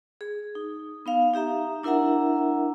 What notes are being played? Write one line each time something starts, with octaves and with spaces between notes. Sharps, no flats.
G#4
D#4
B3 D#4 F5
D#4 G4 E5 A#5
D4 E4 A#4 E5 F#5 A#5